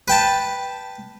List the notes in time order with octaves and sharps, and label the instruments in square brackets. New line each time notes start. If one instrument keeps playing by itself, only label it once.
[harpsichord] B4 G5 A5